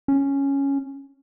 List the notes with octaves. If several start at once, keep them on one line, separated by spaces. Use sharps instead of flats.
C#4